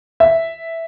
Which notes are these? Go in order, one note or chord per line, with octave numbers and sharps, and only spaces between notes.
E5